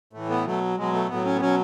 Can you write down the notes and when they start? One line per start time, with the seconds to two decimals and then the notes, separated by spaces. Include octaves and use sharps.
0.13 A2 E3 A3
0.29 B3
0.45 B2 F#3 A3
0.77 B2 F#3 G#3
0.93 A3
1.08 A2 F#3 B3
1.25 C#4
1.36 B3
1.41 B2 F#3 C#4